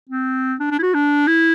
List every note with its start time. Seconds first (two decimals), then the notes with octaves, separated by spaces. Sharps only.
0.10 C4
0.60 D4
0.71 D4
0.79 E4
0.83 F#4
0.94 D4
1.28 E4